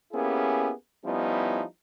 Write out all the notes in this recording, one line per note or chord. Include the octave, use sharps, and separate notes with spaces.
A#3 B3 C#4 E4 G4 G#4
F3 G3 B3 C#4 D#4 E4